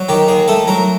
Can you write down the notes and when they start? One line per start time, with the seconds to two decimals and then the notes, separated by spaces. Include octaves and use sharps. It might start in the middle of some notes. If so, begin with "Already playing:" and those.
Already playing: F#3
0.09 D#3 G4
0.28 D#2 G#4
0.48 A3 A4
0.67 F#3 A#4